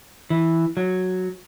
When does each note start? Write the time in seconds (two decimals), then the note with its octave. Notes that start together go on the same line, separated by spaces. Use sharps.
0.30 E3
0.77 F#3